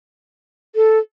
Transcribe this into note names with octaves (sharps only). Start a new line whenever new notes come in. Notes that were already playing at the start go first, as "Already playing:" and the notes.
A4